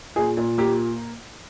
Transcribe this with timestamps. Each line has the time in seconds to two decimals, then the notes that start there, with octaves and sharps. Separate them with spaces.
0.16 A#2 G#4
0.37 A#2
0.58 A#3 G4